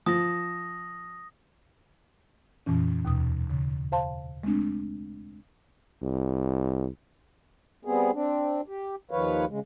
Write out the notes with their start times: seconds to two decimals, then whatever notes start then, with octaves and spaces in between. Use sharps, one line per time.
0.06 F3 D#6 A#6
2.66 F2 A#2 E3 C#4
3.05 D#2 B2 D#6
3.50 C#3
3.92 C5 F5 A5 C6
4.44 G#3 A3 C4 D4
6.02 C2
7.85 G3 B3 C4 G#4
8.13 C4 D4
8.68 G4
9.11 D#2 D#3 F3 B4 C#5 F5
9.49 C#3 G#3